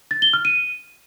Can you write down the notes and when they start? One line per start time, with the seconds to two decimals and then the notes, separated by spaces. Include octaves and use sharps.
0.11 A6
0.22 G7
0.33 F6
0.45 D#7